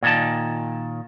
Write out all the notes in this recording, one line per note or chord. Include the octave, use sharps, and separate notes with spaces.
A#2 D#3 A5